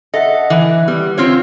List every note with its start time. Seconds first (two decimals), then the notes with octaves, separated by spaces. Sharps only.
0.14 A4 D#5 E5 F#5
0.50 E3 D6 F#6
0.88 G3 B3
1.17 C4 F4 C#5